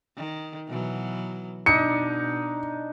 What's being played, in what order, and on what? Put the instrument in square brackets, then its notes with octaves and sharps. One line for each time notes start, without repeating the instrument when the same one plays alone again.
[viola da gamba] D#3
B2 E3 F#3
[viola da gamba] B2 [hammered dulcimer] D4 D#4 [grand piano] C#7